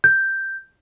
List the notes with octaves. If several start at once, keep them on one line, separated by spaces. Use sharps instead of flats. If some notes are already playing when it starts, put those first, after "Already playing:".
G6